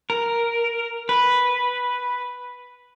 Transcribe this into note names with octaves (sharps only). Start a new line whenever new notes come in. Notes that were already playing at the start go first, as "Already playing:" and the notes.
A#4
B4